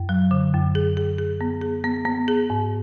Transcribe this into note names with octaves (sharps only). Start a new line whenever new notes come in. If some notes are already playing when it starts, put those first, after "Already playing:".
Already playing: F#2
F#3
D3
F#2
G#4
G#4
G#4
B3
G#4
B3
B3
G#4
G#2